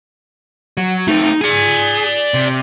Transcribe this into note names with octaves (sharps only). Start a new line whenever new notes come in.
F#3
A3 C4 D#4
G#4 D5 G#5
C3